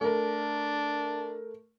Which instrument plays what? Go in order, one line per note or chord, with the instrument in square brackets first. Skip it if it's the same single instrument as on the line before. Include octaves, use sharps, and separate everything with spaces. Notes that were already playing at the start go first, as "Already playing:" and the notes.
[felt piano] A3 A#4 [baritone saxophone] D4